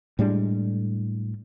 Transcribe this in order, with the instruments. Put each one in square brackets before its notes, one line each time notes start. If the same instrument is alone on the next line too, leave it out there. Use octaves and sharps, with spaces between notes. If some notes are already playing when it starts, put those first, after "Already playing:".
[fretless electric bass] A2 G3 G#3 D4